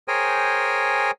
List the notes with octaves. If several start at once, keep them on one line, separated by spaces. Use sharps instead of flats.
G#4 A#4 C5 C#5 G5 G#5